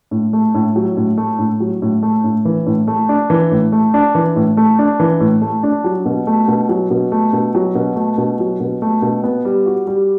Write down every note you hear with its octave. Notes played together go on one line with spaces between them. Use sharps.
A2
A3
A2
F#3
A2
A3
A2
F#3
A2
A3
A2
E3
A2
A3
D4
E3
A2
A3
D4
E3
A2
A3
D4
E3
A2
A3
D4
F#3
B2
A3
B2
F#3
B2
A3
B2
F#3
B2
A3
B2
F#3
B2
A3
B2
B3
G3
F#4
G3